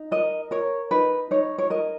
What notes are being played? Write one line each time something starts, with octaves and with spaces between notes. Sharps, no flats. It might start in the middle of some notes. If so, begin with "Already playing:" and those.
Already playing: D#4
A#4 D#5
A#4 C#5
D#4 B4
D#4 C#5
C#5
A#4 D#5